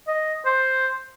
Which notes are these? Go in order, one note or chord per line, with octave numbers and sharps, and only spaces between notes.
D#5
C5